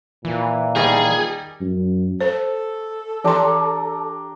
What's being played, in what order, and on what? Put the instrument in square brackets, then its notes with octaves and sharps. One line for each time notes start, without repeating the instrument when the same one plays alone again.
[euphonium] A#2 [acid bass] E3
[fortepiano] D#3 G3 D#4 [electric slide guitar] G#4
[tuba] F#2
[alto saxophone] A4 [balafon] C5
[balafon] E3 C6 [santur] D4 G4 A#5